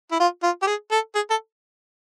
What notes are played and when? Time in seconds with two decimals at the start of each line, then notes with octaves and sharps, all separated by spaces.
0.11 E4
0.20 F4
0.43 F4
0.62 G4
0.67 G#4
0.91 A4
1.15 G#4
1.30 A4